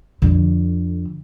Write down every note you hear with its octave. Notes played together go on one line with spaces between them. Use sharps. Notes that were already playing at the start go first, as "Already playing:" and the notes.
F2 D3